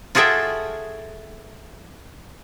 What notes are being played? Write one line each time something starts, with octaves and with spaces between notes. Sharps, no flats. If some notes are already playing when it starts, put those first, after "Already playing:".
F4 F#4 G#4 A4 E5 G5